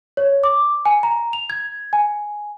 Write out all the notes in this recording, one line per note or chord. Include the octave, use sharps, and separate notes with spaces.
C#5
D6
G#5
A#5
F7
G#6
G#5